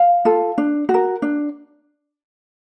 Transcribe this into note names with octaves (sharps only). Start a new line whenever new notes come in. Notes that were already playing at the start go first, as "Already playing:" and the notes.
Already playing: F5
F4 A4
D4
F#4
A#4
D4